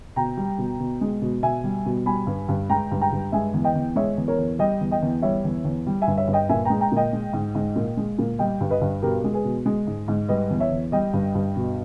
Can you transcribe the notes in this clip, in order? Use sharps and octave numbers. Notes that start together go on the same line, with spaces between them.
B2 G5 A#5
G3
B2
B2
G#3
B2
B2 E5 G#5
G3
B2
G3 G#5 B5
G2
G2
G#3 G5 A#5
G2
G5 A#5
G2
G#3 E5 G#5
E2
D#5 G5
E2
G#3 C#5 E5
E2
A#4 C#5
E2
G3 D#5 G5
E2
D#5 G5
E2
G3 C#5 E5
E2
E2
G3
E5 G#5
G2
C#5 E5
G2
D#5 G5
A#2 E5 G#5
G#3 G5 A#5
G5 A#5
A#2 D#5 G5
G#3
G#2
G#2
A#2
G#3
A#2
G3 D#5 G5
G2
B4 D#5
G2
B2 G4 A#4
G#3
G#4 B4
B2
G#3
G#2
G#2
G3 B4 D#5
E2
C#5 E5
E2
G3 D#5 G5
G2
G2
B2